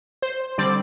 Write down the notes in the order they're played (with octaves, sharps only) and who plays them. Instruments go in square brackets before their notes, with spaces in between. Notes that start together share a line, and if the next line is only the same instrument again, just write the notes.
[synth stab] C5
D3 G3 C4 D5